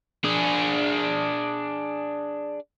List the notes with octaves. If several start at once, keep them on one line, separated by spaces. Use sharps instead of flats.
D4 G#4